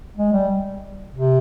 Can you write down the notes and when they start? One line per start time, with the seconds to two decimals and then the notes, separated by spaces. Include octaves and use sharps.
0.17 G#3
0.33 G3
1.15 C3